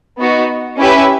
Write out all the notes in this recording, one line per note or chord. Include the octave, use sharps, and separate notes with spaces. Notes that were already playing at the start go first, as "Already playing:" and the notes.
B3 D#4 F#4
C#4 E4 G4 B4 E5